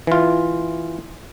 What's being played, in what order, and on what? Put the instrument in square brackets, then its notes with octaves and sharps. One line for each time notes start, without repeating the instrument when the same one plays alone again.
[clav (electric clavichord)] E3 F4